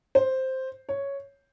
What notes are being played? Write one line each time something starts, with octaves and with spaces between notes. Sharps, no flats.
C5
C#5